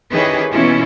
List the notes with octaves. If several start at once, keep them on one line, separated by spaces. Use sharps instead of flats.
D#3 C#4 E4 G4 G#4 B4
B2 E3 A#3 C#4 E4 F4